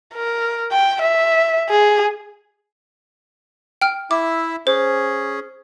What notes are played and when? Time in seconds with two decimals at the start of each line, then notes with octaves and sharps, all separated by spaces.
0.14 A#4
0.72 G5
1.02 E5
1.69 G#4
3.82 G5 F6
4.11 E4 E5 D6
4.67 C#4 G#4 C5